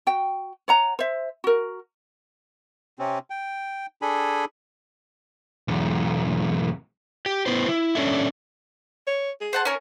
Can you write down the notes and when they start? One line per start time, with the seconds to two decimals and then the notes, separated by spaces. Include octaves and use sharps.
0.07 F#4 G5
0.68 C#5 F#5 A#5
0.99 C5 E5
1.44 F#4 A#4
2.99 C3 C4 C#4
3.30 G5
4.02 D4 G#4 A4 G#5 B5
5.68 B1 E2
7.26 G4
7.46 B3 E4 B4 C5
7.68 E4
7.95 C#4 D4 A4 E5
9.07 C#5
9.41 G#4
9.53 C5 F#5 A5
9.65 C#4 A#4 C#5